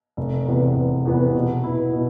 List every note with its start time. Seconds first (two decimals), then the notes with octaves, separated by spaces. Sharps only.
0.17 F1
0.47 E2 C3 E3 B3
0.76 F1
1.05 E2 C3 E3 B3
1.35 B2
1.64 B3 E4
1.93 B2